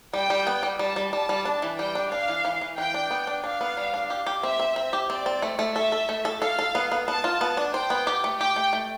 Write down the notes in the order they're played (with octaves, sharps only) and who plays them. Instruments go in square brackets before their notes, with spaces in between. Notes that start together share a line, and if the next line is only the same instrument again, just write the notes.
[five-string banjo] G3 [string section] G5
[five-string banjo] G3
B3
G3
[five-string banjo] G3 [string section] A5
[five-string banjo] G3
[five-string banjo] G3 [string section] A5
[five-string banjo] G3
D4
E3
[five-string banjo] G3 [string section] G5
[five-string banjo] D4
[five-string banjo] D4 [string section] F5
[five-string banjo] E3
E3
E3
[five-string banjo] E3 [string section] G5
[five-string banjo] D4
B3
D4
[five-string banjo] D4 [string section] F5
[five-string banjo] B3
G3
D4
G4
G4
[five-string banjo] C4 [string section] E5
[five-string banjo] C4
C4
G4
[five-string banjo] C4 [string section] D5
[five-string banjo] C4
A3
A3
[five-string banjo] A4 [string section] E5
[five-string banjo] A4
A3
A4
[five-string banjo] A4 [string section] F5
[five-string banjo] A4
B3
B3
[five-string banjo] B3 [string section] A5
[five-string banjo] F4
B3
D4
[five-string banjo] C5 [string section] G5
[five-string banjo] B3
G4
A3
[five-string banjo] G4 [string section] G5
[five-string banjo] A3
A3